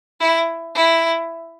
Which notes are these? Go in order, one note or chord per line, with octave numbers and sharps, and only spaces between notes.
E4
E4